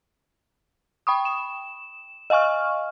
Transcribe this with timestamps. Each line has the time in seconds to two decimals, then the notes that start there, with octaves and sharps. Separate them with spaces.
1.07 G5 B5 C#6 D#6
1.25 E7
2.30 D#5 F5 G#5 C#6 F6